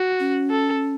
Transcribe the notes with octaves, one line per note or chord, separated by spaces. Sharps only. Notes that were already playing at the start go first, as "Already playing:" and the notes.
Already playing: F#4
C#4
A4